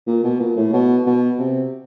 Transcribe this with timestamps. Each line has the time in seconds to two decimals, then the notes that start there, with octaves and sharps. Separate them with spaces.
0.07 A#2
0.24 B2
0.40 A#2
0.56 A2
0.73 B2
1.06 B2
1.39 C3